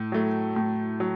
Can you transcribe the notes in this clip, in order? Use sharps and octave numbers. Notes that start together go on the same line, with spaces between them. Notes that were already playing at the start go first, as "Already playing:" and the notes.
Already playing: A2
F#3 A3
A2
F#3